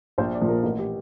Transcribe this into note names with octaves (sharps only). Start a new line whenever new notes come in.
A#1 C5
D5
A#2 F3
A#4
A1 A#4
G4